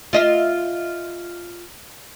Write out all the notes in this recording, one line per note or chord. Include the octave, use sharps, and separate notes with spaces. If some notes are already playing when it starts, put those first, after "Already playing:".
F4 D#5 E5